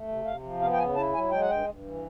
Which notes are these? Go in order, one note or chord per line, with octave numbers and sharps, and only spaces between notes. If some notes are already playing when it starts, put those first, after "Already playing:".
Already playing: A3
C3
C3 F5
F3
B3 F5
G5
C#3 G#5
E4 A5
F#3 G#5
G#3 G5
F#5
G2 G5
G2
E3